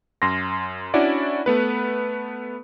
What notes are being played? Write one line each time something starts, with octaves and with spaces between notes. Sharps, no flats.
F#2 C6 A#6
C#4 D4 E4 F#4 D5
A3 B3 B4